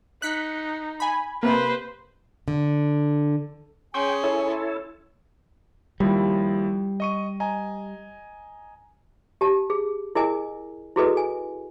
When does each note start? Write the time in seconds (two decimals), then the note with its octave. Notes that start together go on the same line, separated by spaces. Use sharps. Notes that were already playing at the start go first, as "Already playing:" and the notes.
0.22 D#4 F#6 B6 C#7
1.00 G#5 B5
1.43 C3 A#3 B4 C5
2.48 D3
3.94 C#4 G#4 G5 G#5 C6
4.24 E4 A4 C#5
6.00 D#2 F3 G3 E4
7.00 D#5 C#6 D#7
7.40 D#5 G#5 A#5
9.41 G4 A5
9.70 G#4
10.15 E4 G#4 A#4 D#5 G#5
10.96 E4 F#4 G#4 A4 B4 D#5
11.17 G#5